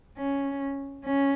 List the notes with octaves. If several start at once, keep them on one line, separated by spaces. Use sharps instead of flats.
C#4
C#4